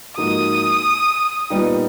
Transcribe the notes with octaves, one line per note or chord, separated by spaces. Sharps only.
G#2 F3 A#3 D#4 F#4 D#6
A#2 G3 B3 D#4 G4